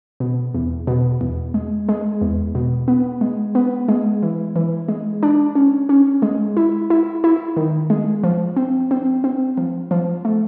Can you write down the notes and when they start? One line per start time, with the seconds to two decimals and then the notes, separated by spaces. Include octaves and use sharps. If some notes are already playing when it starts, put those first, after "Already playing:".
0.20 B2
0.54 E2
0.87 B2
1.21 E2
1.54 G#3
1.89 G#3
2.21 E2
2.55 B2
2.88 B3
3.21 G#3
3.55 B3
3.89 G#3
4.22 E3
4.56 E3
4.88 G#3
5.23 D4
5.55 C#4
5.89 C#4
6.22 G#3
6.57 E4
6.90 E4
7.24 E4
7.57 D#3
7.90 G#3
8.24 F3
8.56 C4
8.91 C4
9.24 C4
9.58 F3
9.91 F3
10.25 A3